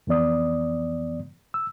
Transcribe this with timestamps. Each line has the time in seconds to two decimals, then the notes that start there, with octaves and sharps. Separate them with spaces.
0.07 F2 E3 B3 D5 D#6
1.54 E6